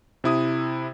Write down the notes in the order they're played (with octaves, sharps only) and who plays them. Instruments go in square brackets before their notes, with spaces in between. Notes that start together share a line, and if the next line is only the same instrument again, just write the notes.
[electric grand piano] C3 E4 D#6